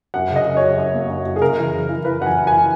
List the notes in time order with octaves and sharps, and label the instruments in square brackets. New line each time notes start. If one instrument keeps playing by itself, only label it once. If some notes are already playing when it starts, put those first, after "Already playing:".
[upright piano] F#2 F#5
C#3
D#5
F#2
F#2 C#5
F#2
A#3
F#2
F#2
G#4
C#3 A#4
E3
F#2
E3
E3 B4
F#2 F#5
G#5
F#2
G#5
E3